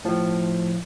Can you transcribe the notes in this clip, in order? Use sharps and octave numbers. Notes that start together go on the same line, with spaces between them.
A2 F3